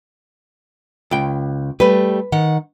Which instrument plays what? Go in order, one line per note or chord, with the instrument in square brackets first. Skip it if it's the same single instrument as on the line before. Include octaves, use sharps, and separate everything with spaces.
[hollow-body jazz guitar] C#2 G5
[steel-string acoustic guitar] G3 A3 [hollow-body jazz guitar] B4
[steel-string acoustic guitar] D#3 F#5